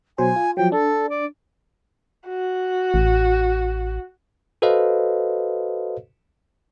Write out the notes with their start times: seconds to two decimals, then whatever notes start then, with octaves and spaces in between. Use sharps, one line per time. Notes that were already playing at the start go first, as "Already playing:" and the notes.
0.18 B2 F#3 C5 G#5
0.36 F4
0.57 F3 F#3 G5
0.72 D4 A4
1.09 D5
2.28 F#4
2.94 A1
4.62 F#4 A4 B4 C5 D#5 F5